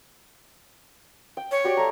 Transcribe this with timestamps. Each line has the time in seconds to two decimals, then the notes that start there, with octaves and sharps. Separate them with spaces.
1.37 G5
1.51 C#5
1.64 F#4 G4 D5
1.77 A3 A#5